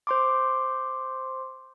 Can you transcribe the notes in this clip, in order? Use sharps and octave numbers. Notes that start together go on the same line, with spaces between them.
C5 C6 D6